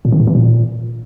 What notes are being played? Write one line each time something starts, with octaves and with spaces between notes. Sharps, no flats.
A#2
D#3
A2
E3
A#2